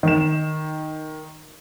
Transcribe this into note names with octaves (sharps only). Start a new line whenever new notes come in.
D#3 E7